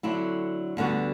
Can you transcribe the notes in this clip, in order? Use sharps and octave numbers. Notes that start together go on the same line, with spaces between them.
D3 F#3 A3 C4 E4
D2 D3 G3 B3 F#4